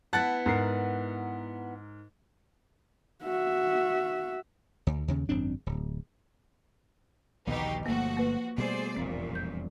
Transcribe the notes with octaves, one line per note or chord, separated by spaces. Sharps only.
B3 E4 F#5 A5 F#6 A6
G#2 A#4 C7
F#4 E5
D2
D#2 C#3
G#1 F#2 C4 D4
D1
A#1 D#2 B2 D3 D#4 G4
G1 F3 A3 A#3 F#4
A#3 B4
B2 G3 A3 G#4 C5 D5
E1 C2 F2 A#2 C4
G6